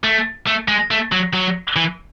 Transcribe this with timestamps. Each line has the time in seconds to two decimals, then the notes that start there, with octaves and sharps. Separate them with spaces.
0.03 A3
0.47 A3
0.68 G#3
0.91 A3
1.12 F#3
1.33 F#3
1.76 E3